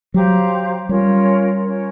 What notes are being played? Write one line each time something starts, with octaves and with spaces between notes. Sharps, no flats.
F#3 G4 C5 F5 A#5
G3 C#4 F4 A#4 C#5
C#4 F4 A#4 C#5